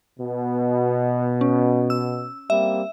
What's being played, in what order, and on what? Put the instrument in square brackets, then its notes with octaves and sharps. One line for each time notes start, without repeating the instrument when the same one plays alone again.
[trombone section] B2
[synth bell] C#4
E6
[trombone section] G3 A#3 C4 [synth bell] E5